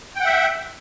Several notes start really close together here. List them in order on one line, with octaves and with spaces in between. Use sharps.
G5 F#5 E5